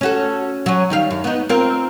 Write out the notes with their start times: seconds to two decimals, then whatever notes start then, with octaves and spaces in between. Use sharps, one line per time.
0.01 C#4 F#4 A4
0.66 F#3 C#4
0.90 D#3 G3 F5
1.10 F#2
1.24 B3 D#4
1.49 C4 F4 A#4